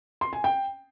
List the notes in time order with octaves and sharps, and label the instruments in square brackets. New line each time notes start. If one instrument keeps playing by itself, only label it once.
[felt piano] C6
G#5
G5